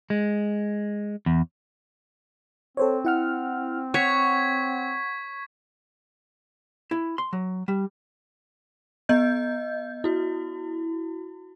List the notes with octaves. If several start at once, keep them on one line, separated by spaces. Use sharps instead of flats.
G#3
E2
C4 A4 C5 C#5
E4 F#5 F6
C#5 F#5 C#6 G#6 B6
E4
C6
F#3
G3
B3 D#5 G6
E4 F#4